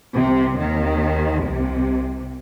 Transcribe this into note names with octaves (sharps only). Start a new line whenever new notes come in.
C2 C3
D#2 D#3
C2 C3